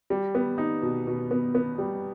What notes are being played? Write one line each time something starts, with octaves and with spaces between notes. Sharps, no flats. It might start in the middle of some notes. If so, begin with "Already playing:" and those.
G3
B3
D#4
B2
B2
B3
B3
G3